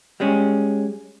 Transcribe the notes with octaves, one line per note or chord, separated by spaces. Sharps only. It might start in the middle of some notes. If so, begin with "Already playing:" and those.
G3 G#3 C#4